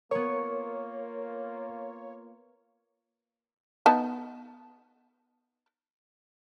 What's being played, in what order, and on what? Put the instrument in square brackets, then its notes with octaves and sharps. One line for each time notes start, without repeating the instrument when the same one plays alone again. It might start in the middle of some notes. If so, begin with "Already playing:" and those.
[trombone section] A#3 F4 [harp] B3 C#6 [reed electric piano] A#4 [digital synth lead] C#5
[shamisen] B3 D#4 A5